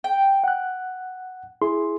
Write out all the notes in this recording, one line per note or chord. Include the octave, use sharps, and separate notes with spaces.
G5
F#5 F#6
E4 G#4 C6